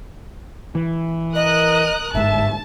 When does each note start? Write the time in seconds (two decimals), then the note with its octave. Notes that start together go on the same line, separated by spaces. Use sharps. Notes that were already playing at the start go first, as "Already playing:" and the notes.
0.75 E3
1.35 A#4 D#5 D#6 F#6
2.15 G1 G#2 E5 A5